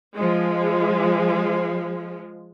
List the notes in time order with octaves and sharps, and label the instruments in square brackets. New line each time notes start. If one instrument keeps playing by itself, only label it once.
[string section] F3 G#3